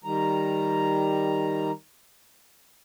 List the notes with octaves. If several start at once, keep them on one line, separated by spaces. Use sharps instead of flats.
D#3 G3 A#5